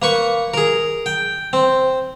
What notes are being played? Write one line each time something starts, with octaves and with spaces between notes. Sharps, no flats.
A#3 B4 C#6
G#4 A#4
G5
C4